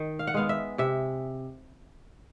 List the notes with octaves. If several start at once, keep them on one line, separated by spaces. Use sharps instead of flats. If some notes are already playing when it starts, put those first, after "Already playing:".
Already playing: D#3
F5
F#5
G#3 B3 F5
E5
C3 E5